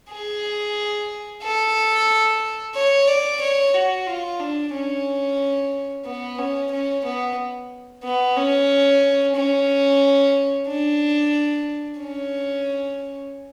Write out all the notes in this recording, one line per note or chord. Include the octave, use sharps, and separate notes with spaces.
G#4
A4
C#5
D5
C#5
F#4
F4
D4
C#4
B3
C#4
C#4
B3
B3
C#4
C#4
D4
C#4